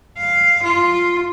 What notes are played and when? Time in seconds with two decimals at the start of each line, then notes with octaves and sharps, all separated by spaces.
0.17 F5
0.63 F4